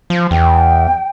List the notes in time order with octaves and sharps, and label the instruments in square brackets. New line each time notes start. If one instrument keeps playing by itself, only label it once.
[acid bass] F3
[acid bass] E2 [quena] G5